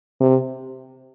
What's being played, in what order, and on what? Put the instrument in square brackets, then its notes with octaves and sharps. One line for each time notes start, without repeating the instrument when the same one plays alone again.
[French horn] C3